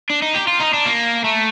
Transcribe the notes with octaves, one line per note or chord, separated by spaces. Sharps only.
D4
D#4
G4
F4
D#4
D4
A#3
A3